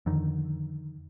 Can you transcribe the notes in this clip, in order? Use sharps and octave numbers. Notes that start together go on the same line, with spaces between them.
F2 D3 D#3